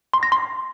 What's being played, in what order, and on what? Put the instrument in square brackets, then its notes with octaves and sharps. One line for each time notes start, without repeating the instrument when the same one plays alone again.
[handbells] C6
A#6
C6